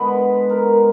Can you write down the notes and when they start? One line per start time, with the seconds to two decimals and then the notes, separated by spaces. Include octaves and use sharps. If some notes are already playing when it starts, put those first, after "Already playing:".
Already playing: D3 G#3 B3 B4
0.49 A#4